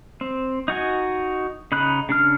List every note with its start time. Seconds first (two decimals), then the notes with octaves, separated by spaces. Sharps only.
0.21 C4
0.68 D#4 F#4 G#5
1.72 C#3 D#4 B5 F#6
2.09 C#3 D4 F6